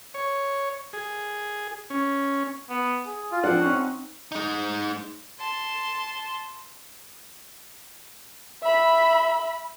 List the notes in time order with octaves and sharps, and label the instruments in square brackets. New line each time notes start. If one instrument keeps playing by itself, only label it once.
[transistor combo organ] C#5
G#4
C#4
[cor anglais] B3
G#4
[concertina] F4
[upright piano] F3 G#3 D4 [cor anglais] C4 [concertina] F#5
[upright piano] C4 D#4 [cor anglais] C#4
[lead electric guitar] G#3 D#4
[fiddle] A5 C6
[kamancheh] E5 B5